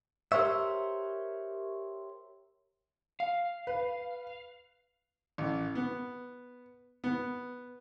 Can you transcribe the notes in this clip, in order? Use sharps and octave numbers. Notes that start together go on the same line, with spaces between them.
G4 A#4 C5 C#5 E5
F5
B4
A1
B3
B3